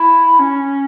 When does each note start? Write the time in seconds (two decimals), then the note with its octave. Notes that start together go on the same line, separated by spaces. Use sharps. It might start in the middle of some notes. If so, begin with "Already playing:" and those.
Already playing: E4
0.39 C#4